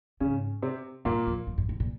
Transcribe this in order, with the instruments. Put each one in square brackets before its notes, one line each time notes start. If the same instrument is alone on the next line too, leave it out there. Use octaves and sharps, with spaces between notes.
[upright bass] G#2 [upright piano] C#3 C#4
[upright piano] C3 C4
[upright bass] G2 [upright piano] A#2 A#3
[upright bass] F2
G2
G2
G#2
A#2